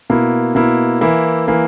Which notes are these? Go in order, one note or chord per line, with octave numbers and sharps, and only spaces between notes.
B2 A#3 E4
B2 A#3 E4
E3 A#3 E4
E3 A#3 E4